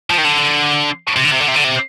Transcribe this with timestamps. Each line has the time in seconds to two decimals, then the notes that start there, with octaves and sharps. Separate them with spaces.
0.10 F3
0.18 D#3
0.25 D3
1.16 C3
1.24 D3
1.32 C3
1.40 D3
1.48 C3
1.56 D3
1.64 C3